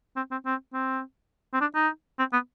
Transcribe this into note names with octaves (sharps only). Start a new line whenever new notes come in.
C4
C4
C4
C4
C4
D4
D#4
C4
B3